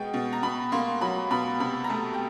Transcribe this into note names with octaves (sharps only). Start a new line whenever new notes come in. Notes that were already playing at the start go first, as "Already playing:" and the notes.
Already playing: B2 G#3 B3 G5
B2
A#5
B2 B5
A#3 C6
F#3 B5
B2 B5
C3 B5
A#5
A3 A5
G5